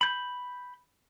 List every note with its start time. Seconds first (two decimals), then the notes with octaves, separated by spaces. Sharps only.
0.01 B5 G6